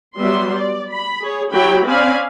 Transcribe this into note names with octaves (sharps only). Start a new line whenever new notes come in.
F#3 G3 B3 E5 C6
D5
B5
G#4 C#5
F#3 E4 G4 C#5 G5 B5
C4 C#4 D5 F5 G#5 B5